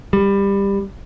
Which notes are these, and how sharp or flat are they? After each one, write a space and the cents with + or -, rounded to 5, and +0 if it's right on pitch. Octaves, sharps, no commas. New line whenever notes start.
G3 +20